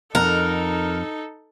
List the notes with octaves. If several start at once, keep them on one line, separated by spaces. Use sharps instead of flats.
F2 D#4 A4 A#4 F#5